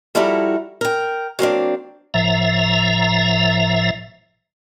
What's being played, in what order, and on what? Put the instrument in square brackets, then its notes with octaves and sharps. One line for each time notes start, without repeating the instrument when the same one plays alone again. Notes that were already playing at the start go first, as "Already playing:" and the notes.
[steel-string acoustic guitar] F3 G3 E4 F#4 A4 A#4
A#4 G5
F#3 A#3 C4 D4
[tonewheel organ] F#1 A2 F3 E5 A#5